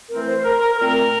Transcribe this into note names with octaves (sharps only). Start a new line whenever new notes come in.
E3 A3 C4 A#4
C5
A#4
A#4
A#2 A3 C4 A#4